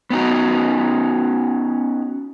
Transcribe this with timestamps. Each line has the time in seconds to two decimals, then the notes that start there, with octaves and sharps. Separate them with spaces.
0.10 B3 C#4 D#4 F#4